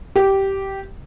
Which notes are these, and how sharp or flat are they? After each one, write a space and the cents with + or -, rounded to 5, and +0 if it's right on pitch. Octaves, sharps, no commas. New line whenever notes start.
G4 -10